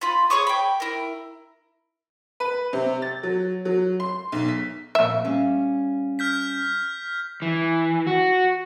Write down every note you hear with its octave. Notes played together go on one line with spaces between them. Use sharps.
F4 B5
G#4 C#5 C#6 D#6
G5 B5
E4 A#4
B4
C3
A6
F#3
F#3
C6
B1
B6
F2 A#2 E5
G3 C#4 F5
F6 G6 B6
E3
F#4